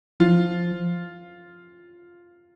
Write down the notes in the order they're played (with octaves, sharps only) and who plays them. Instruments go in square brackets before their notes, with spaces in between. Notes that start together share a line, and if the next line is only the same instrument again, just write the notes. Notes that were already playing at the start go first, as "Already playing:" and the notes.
[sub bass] F3 [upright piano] F4